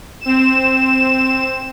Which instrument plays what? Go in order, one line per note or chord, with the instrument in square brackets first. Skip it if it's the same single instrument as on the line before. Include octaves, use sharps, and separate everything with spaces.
[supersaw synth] C4 E7